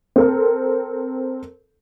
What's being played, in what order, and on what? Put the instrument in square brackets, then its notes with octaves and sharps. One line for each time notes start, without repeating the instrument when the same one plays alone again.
[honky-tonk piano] C4 A4 A#4